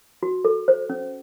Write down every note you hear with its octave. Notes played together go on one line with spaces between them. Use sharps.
F#4
A4
C5
C#4